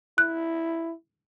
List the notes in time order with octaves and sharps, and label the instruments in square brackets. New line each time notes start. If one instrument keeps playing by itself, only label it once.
[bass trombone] E4 [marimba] F#6